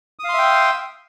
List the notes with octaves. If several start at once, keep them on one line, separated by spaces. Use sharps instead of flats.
E5 F5 G5 C6 D#6